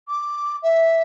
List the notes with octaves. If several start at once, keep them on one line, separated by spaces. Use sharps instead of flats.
D6
E5